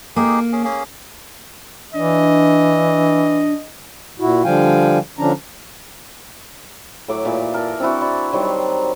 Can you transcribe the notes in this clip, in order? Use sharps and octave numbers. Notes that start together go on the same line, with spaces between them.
A#3 D#4 G4 G#4
C#4 G#4
A#3 C#4 G#4
E3 D4 D#5
A#2 E4 F#4
D3 F3 G3 F5 G5 G#5
D3 F3 C#4 D4 A#5
A2 F#3 D6
A#2 E3
A4 A#4
C4 D4 E4 F#4
E4 D5
D#3 F#3 G3 C5